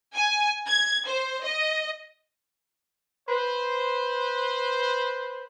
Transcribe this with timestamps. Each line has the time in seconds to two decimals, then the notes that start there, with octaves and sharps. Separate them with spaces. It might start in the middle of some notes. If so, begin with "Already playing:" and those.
0.16 G#5
0.67 G#6
1.07 C5
1.44 D#5
3.29 B4 C5